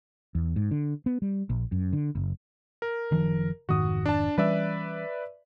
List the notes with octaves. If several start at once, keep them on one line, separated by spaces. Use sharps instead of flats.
E2
G#2
D3
B3
G3
A#1
F#2
D3
F#1
A#4
F#1 D#3 F3
F1 G#2 D#3 F#4 D#6
D4 A5
E3 G3 C#4 B4 D5 E5